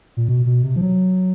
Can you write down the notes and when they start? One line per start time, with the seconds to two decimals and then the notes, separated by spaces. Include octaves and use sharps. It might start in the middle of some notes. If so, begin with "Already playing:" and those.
0.17 A#2
0.29 B2
0.46 B2
0.63 C3
0.76 F3
0.81 F#3